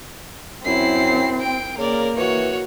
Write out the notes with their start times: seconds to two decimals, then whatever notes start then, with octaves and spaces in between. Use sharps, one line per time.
0.65 F#2 C4 E4 C7
1.39 G5 D7
1.78 C#3 A#3 A#4 D5
2.17 E3 F#4 C#5